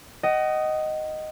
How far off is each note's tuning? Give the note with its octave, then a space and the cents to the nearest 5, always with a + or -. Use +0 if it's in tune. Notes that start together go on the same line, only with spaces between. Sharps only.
D#5 +0 F#5 +35